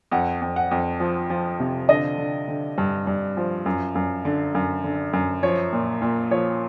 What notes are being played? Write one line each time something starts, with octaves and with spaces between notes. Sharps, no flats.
F2 F#5
F2
F#5
F2
F3
F3
C3
D3 D#5
D3
D3
G2
G2
F3
F#2
F#2
D3
F#2
D3
F#2
F3 C#5
A#2
A#2
F3 C#5